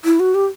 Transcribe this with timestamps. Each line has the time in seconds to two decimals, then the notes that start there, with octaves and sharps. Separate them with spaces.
0.05 E4
0.20 F#4
0.34 G4